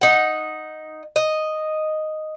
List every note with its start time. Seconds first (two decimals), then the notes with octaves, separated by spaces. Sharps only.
0.01 D#4 F#5
1.16 D#5